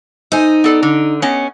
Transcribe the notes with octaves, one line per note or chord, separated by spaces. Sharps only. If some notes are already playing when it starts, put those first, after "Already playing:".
D#4 A4 C5 G#5
B3 A4 D5
D3
B3 C#4 D#5